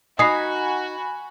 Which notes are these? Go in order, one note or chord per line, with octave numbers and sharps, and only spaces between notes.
D#4 F#4 G#5 B5 D#6 C7